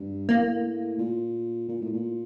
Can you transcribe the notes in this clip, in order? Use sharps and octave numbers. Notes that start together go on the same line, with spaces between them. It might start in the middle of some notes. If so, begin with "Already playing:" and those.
Already playing: G2
A2 A#3
A#2
A#2
A2
A#2